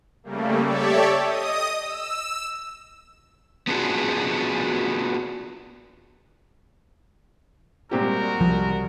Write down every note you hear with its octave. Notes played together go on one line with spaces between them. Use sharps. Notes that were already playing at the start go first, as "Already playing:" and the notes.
C#3 G3 A3 A#3
G4 A4 C#5 D5 E5
D#5 D#6
E6
B3 C#4 D4 F4 F#4 G#4
A#2 G3 G#3 C4 C#4 F#4 G4 A#4
C2 F3